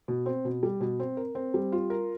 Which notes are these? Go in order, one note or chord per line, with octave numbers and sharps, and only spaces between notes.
B2
C4
B2
G3
B2
C4
A#4
C4
G3
F4
A#4